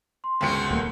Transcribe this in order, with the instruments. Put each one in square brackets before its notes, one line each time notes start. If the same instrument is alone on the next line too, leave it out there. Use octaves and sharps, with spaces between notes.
[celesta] C6
[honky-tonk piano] G1 C#2 C#7 [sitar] C4 C#4 F#4
[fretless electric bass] D#1 A3 A#3